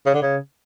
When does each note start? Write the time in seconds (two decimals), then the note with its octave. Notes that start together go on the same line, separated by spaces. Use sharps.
0.06 C#3
0.14 D3
0.22 C#3